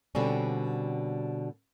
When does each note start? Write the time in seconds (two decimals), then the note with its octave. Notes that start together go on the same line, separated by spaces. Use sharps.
0.15 B2 D3 G3 C4 C#4